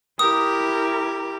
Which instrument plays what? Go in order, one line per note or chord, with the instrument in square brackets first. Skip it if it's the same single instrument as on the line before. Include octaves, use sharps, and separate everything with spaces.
[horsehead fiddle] E4 A#4 [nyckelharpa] G4 [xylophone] D#6